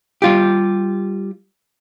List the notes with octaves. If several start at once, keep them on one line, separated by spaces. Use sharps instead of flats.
G3 F4 G4